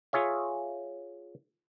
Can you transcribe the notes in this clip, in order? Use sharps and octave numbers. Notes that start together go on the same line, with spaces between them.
F4 G#4 C#5 E5